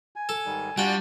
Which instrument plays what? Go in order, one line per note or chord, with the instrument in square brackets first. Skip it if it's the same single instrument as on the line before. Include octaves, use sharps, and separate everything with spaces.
[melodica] G#5
[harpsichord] A4
[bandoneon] G#2 D#3 G3
[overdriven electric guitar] G3 [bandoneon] D4 F4 F#4 [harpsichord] F#5 G5